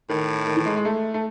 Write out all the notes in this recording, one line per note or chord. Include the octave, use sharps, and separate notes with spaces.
A2 D#3
D#3
E3
G#3
G#3
A3
A3